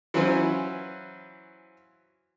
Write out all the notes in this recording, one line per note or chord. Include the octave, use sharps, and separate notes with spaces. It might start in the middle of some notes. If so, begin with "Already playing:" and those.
E3 F#3 C#4 F4 B4 C5